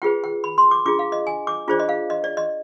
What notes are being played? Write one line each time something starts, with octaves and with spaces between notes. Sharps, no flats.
F4 G#4 B4 G5
G5
B5
C6
D6
D4 F4 G#4 D6
F5
D#5
G#5
D6
D4 F4 G#4 C5 D5
D#5
F5
D#5
D5
D#5